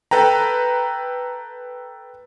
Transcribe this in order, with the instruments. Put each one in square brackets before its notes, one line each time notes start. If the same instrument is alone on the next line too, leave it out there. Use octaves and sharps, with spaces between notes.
[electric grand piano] A4 B4 G5 A#5